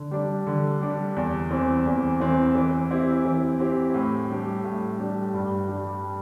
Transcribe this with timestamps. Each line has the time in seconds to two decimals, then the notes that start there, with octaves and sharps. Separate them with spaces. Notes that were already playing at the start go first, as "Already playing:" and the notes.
Already playing: D3
0.11 G3 D4
0.47 D3
0.81 G3 D4
1.16 E2
1.51 E3 C4
1.86 E2
2.20 E3 C4
2.55 E3
2.91 C4 E4 G4
3.25 E3
3.59 C4 E4 G4
3.94 A2
4.29 G3 D4 G4
4.64 A2
4.99 G3 D4 G4
5.34 G2
5.68 G3 D4